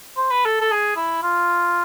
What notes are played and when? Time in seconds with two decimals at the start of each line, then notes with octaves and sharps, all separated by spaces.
0.17 C5
0.31 B4
0.46 A4
0.61 A4
0.71 G#4
0.97 E4
1.23 F4